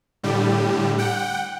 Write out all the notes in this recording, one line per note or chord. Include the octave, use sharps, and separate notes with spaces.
A2 D3 G3 G4
F#5 G5